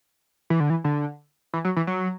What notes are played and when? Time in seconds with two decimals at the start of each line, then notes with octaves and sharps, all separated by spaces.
0.50 E3
0.60 D3
0.70 E3
0.84 D3
1.54 E3
1.65 F#3
1.76 E3
1.87 F#3